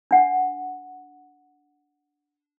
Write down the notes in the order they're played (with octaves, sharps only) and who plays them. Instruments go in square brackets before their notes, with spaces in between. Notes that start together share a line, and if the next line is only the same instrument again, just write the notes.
[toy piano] D4 F#5